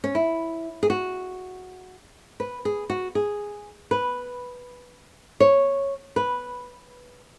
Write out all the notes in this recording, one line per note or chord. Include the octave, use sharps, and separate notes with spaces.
C#4
E4
G#4
F#4
B4
G#4
F#4
G#4
B4
C#5
B4